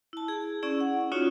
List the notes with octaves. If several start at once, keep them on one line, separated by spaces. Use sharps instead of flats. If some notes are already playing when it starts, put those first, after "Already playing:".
E4 A5
G#4
C#4 E4 G#4 D5
F#5
C#4 D#4 F4 F#4 C#5